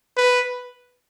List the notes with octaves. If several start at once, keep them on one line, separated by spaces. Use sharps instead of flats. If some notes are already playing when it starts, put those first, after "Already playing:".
B4